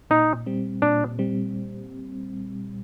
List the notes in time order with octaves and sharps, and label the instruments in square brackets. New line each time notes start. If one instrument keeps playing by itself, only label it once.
[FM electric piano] A#2 [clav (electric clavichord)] D#4
[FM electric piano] G3 C4
[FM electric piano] A#2 [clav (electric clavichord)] D4
[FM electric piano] G3 C4